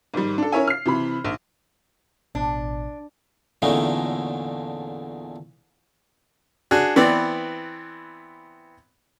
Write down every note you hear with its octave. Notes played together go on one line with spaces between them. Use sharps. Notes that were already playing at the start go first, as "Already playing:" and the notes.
G#2 D#3 G3
D4 A4
C#4 E4 A#4 C#5 E5 G#5
F6 C7
C3 E3 B5
A#1 D#3
A1 B2 D4
E2 A#2 D3 A3 C#4 D#4
D4 F#4 G#4
E3 B3 C4 D5